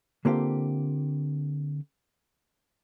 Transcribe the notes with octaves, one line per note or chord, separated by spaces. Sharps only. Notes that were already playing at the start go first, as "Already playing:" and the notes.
D3 A#3 C4 F4 G4